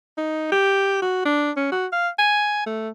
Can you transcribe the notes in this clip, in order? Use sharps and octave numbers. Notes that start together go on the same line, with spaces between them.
D#4
G4
F#4
D4
C#4
F#4
F5
G#5
A3